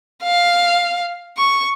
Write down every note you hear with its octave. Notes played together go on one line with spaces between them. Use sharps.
F5
C#6